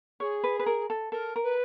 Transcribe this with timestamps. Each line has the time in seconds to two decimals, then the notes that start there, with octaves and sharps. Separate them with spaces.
0.20 G#4 C#5
0.44 B4
0.59 B4
0.66 A#4
0.90 A4
1.12 A4 A#4
1.36 A#4
1.43 B4